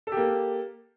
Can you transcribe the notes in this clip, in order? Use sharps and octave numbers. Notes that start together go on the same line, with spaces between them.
A#3 G4 A4